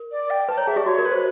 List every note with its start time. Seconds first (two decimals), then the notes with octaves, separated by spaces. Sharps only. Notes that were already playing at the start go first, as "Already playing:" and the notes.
Already playing: A#4
0.12 D5
0.30 G5
0.49 B4 A5
0.58 C#5 A#5
0.67 G#4 E5
0.76 G4 D5
0.86 F#4 C#5
0.99 A#4
1.05 B4
1.11 C5